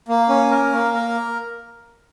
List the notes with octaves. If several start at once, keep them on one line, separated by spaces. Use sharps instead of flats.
A#3
C#4
A#4
A#3
A#4